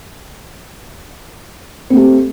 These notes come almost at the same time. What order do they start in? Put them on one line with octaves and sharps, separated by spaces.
C4 A3 G4